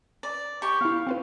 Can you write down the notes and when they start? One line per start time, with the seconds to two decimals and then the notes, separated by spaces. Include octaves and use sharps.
0.23 D5
0.62 G4 C#6
0.81 B3 E4 F5
1.07 C4 F4 B4